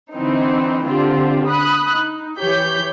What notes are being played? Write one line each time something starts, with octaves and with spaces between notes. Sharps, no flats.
D3 E3 C4 D#4
D3 C4 F4 G4
B5 D#6 F#6
D#4
E3 G4 C#5 G6 B6